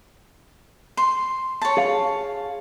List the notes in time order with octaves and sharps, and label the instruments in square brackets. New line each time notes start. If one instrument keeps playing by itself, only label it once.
[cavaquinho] C6
C#5 A5
[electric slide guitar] G#4 F5